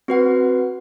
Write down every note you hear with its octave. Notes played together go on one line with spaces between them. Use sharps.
C4 F#4 B4 F#5